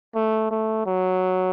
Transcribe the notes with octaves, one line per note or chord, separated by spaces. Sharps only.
A3
A3
F#3